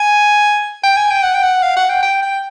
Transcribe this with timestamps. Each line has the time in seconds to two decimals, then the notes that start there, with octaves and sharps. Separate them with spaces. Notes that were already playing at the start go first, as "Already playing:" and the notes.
Already playing: G#5
0.83 G5
0.97 G#5
1.11 G5
1.23 F#5
1.34 G5
1.43 F#5
1.63 F5
1.77 F#5
1.89 G5
2.03 G5
2.22 G5